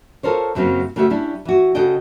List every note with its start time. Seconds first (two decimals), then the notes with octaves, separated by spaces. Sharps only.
0.23 F4 A4 A#4 C5 C#5
0.55 F#2 C#3 F#3 A#3 C4
0.96 C#3 A3 F#4 G4 A4 E5
1.10 G3 C#4 D4 E4
1.45 E3 F#4
1.75 C#3 F#4 G#4 A4 D#5 G5